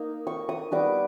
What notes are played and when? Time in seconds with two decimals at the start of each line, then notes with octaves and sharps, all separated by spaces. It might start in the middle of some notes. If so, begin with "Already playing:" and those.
Already playing: A#3 D#4
0.27 C#6
0.49 D#6
0.72 G3 B3 D#4 D6